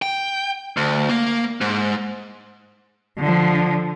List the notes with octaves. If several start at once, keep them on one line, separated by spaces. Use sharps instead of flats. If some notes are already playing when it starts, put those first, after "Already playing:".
G5
D2
A#3
G#2
D3 F3